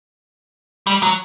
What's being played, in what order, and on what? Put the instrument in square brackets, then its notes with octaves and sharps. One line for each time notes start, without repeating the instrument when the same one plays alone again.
[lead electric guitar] G3
F#3